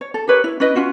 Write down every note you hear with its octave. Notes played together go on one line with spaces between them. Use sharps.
C#5
A4
G4 A#4 B4 C#5
E4
C#4 E4 B4 D#5
C#4 F4 F#4